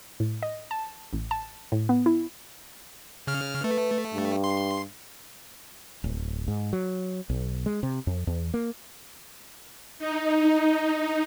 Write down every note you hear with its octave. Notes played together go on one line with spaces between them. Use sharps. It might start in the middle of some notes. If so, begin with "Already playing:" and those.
A2
D#5
A5
A1
A5
A2
B3
E4
C#3 F6
A3 B4
G2
C6
D1
G#2
F#3
B1
G#3
C3
F2
E2
A#3
D#4